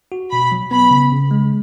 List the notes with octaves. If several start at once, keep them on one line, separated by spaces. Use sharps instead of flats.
F#4
B2 B5
F#3
B3 B5
C#3
C#3
G#3